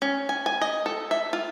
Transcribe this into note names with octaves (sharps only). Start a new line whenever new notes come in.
C#4
G#5
G#5
D#5
A4
E5
F4